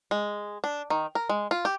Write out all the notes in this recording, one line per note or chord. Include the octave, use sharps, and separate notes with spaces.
G#3
D4
D#3
A#4
G#3
F4
G4